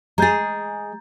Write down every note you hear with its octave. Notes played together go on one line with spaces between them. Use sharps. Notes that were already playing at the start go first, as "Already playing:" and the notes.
G#3 G#4 A#5 G6 A6